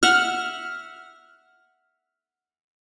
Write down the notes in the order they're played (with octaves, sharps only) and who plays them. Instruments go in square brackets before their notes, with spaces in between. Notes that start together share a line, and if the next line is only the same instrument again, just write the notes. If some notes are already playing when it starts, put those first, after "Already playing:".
[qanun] E5 F#5 [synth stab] F6